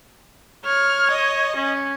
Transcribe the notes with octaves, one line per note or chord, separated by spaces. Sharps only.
C#5 F6
D#5
C#4